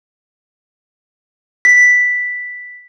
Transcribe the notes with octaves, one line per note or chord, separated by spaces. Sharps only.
B6